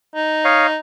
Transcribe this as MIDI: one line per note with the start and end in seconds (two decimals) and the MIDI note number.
0.15 0.78 63
0.45 0.67 73
0.45 0.67 75
0.45 0.67 77